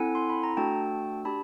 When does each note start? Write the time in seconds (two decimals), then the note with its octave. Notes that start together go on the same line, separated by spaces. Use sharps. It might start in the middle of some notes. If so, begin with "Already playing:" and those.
Already playing: C4 E4 A4 F#5 G#5
0.15 C6
0.30 B5
0.43 A#5
0.57 A3 D4 F#4 A4 G5 A5
1.25 D4 G4 A5 B5